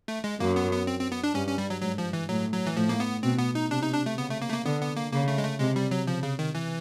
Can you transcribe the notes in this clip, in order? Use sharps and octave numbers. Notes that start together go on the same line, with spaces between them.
A3
G#3
F#2 A#3
B3
B3
C4
C4
B3
D4
G2 C#4
C#4
G3
F#3
G#2 F#3
F3
E3
A2 F#3
F#3
E3
A2 F3
A#3
B3
B2 C4
B3
D#4
C3 D4
D#4
D4
A3
C#3 B3
A3
A#3
A3
A#3
D3 B3
B3
A#3
C#3 A#3
A3
G#3
A3
C3 G#3
G3
F#3
C#3 F3
C#3
D#3
E3